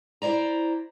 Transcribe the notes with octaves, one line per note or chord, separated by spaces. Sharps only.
E4 C5 D5 A#5